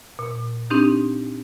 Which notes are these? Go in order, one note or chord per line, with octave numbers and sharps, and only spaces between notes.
A#2
C4 D4 D#4 G4